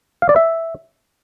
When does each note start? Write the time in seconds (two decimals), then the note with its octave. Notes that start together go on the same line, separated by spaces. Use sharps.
0.22 F5
0.29 D5
0.36 E5